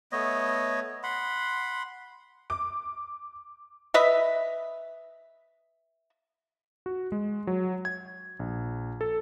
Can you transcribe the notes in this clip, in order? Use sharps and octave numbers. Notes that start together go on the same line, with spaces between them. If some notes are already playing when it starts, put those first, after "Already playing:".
A3 B3 C#5 D#5
F#5 B5 C6
D6
B4 D#5 E5
F#4
G#3
F#3
G#6
A#1
A4